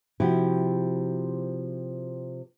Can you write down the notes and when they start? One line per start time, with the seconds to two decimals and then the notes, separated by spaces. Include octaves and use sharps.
0.20 C3 F3 E4 F#4 G4